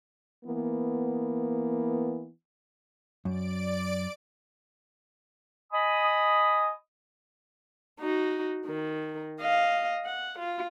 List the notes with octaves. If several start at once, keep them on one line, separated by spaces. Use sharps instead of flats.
E3 A#3 B3
F#2 D5 D7
D#5 G#5 B5 D#6
D#4 F#4
D#3
D#5 F5
F#5
F4